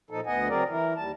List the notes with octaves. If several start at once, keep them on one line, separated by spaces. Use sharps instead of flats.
A#2 F3 D#4 A4
D2 B3 D#5 F#5 G#5
C#3 F#3 C4 G#4 A#4 D5
E3 E4 A#4
D#2 G3 A5